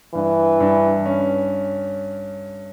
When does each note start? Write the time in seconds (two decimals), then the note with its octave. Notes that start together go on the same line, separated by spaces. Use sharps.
0.14 G2 E3
0.60 G2
1.05 C#4